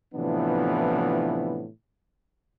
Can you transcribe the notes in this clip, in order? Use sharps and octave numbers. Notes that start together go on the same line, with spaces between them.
A2 C3 E3 F3 B3 D4